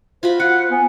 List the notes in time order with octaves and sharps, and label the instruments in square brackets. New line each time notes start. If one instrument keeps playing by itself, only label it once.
[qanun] F4 F#4 B5 [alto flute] C5
[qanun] F4 [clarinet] F#5
[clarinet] B3 [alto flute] G#5